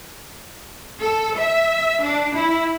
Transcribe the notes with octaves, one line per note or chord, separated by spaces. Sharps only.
A4
E5
D4
E4